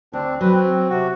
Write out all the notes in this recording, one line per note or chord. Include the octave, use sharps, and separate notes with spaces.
D2 C4 D4
F#3 C4 B4
C4
C3 F#4